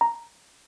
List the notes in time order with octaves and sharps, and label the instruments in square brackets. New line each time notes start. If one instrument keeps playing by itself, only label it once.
[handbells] A#5